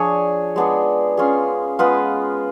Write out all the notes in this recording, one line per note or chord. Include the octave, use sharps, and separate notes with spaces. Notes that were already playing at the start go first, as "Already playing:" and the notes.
Already playing: F3 D4 G#4 C#5
G#3 B3 D4 G#4
C#4 F4 G#4
G#3 B3 F4 B4